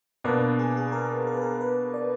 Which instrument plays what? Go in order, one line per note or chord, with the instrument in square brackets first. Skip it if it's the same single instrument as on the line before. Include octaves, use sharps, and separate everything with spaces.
[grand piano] B2 A#3 D4 [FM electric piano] B4
[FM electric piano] G#4
G#4
A#4
A#4
B4
A#4
B4
D5